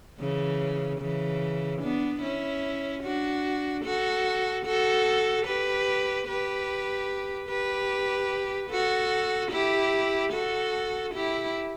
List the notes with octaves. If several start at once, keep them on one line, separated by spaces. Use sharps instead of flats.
C#3 E3
C#3 E3
B3 D4
C#4 E4
D4 F#4
F#4 A4
F#4 A4
G4 B4
G4 B4
G4 B4
F#4 A4
E4 G4
F#4 A4
E4 G4